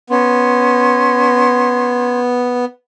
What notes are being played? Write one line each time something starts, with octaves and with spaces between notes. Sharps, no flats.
B3 C#4 C6 G#6